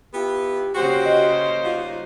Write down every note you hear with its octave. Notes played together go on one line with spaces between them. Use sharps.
B3 E4 F4 G4
C#3 A#3 F#4 G4 C5
D#5
G3 D#4 F4 F#4